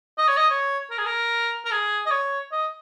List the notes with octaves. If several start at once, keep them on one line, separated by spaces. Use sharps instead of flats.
D#5
C#5
D#5
C#5
A#4
G#4
A#4
A#4
G#4
D#5
C#5
D#5